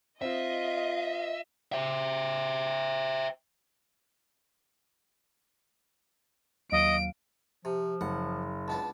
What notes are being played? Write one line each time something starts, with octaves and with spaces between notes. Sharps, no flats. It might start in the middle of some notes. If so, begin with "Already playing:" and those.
C4 F4 D#5 E5
C5 E5
D#2 F#3 D#5 F5 D7
C3 F3
F#1 F#5
C#2 B3 D4 A5